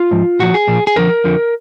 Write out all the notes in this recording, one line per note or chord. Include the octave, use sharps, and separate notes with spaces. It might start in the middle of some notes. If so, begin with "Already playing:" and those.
Already playing: F4
G#2 F3
A#2 F3 F#4
G#4
A#2 F3
G#4
F2 D3 F3 A#4
F2 D3 F3